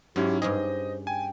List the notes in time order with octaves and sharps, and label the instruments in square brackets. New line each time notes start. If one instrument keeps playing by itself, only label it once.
[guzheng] G#2 [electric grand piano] F#3 C#4 E4 [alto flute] G4
[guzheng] G2 C#4 G#4 [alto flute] C5 [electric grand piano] D#5
[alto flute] G5 [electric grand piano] G#5